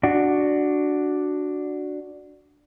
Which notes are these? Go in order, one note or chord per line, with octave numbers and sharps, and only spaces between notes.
D4 F#4